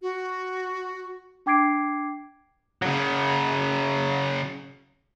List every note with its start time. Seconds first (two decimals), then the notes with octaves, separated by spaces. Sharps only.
0.02 F#4
1.46 D4 G5 D6 G#6 C7 D7
2.82 C#3 F#3